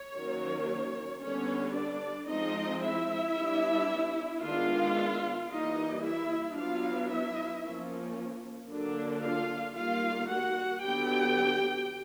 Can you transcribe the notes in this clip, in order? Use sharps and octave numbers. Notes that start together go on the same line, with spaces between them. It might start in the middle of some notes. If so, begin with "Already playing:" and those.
Already playing: C#5
D#3 F#3 A#3 C#4
D3 G3 B3 C#4 C#5
D4 D5
F3 G#3 C4 D#4 D#5
E4 E5
G3 B3 D4
D#3 G#3 B3 D4 F4 F5
E3 G3 A#3 D#4 D#5
E4 E5
F#3 B3 D4 F4 F5
E4 E5
F3 A#3 C#4
D3 F#3 A#3 D4
F4 F5
D#3 G3 A#3 F4 F5
F#4 F#5
D3 F#3 B3 G4 G5